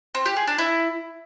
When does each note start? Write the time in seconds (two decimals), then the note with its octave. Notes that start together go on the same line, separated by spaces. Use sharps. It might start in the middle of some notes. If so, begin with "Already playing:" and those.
0.15 C4
0.26 G4
0.37 G#4
0.47 D4
0.58 E4